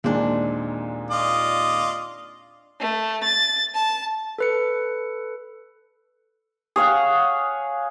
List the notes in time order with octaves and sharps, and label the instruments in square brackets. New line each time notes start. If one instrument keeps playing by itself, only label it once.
[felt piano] D#2 A#2 G#3 [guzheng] C4 D4
[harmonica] F4 D5 D#5
[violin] A3
A6
A5
[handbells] A4 B4 C#7
[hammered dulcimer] G#4 C#5 F5 F#5